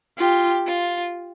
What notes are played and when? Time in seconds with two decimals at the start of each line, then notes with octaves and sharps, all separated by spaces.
0.18 F4 G4
0.66 F4